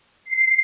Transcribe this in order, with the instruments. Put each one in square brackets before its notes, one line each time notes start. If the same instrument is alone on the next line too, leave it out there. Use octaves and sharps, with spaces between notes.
[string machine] C7